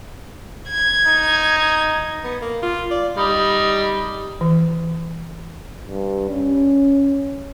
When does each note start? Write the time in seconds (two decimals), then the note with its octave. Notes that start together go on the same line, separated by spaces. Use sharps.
0.69 G#6
1.06 D#4
2.24 B3
2.42 A#3
2.63 F4
2.91 D5
3.16 G3 D#4
4.41 E3
5.84 G2
6.30 C#4